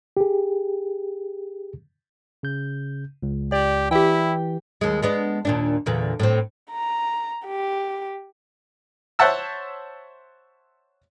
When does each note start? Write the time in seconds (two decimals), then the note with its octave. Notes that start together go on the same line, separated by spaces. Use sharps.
0.17 G4 G#4
2.43 C#3 G6
3.23 C#2
3.52 G4 D5
3.91 E3 E4 G4 G5
4.81 D#2 G#3
5.02 G#3 B3 D4
5.45 D#2 A#2 D4
5.86 E2 A#2 D3
6.20 A2 C4
6.71 A#5
7.46 G4
9.19 C5 C#5 E5 F#5 A5 E6